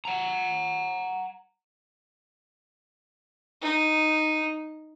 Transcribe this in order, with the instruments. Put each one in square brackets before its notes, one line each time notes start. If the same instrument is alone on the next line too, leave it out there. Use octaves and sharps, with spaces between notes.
[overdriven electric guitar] F#5 A#5
[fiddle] D#4